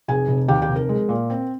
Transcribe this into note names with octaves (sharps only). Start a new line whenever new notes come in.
F1 G#4 G#5
F1
D#2 G4 G5
G4 G5
F1
A#4
G#3
A#2
C4